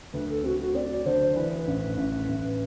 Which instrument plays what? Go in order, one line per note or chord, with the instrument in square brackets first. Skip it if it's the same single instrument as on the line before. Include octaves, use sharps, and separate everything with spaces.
[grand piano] D2 [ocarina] B4
[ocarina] A4
[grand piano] C4 [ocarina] F#4
[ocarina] F#4
[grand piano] C4 [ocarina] D5
[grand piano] D3 [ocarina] C5
[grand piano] E3 [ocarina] B4
[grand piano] A1
A1
A1